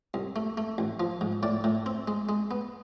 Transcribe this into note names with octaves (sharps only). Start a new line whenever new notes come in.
C2
A3
A3
A1
F3
G#2
A2 D5
A2
C4
G#3
G#3
B3